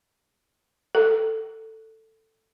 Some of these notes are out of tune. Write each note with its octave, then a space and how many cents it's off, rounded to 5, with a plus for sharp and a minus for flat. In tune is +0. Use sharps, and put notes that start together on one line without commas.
A4 +10